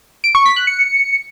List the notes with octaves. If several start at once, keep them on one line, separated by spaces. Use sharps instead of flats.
D7
C#6
B6
F#6
C#7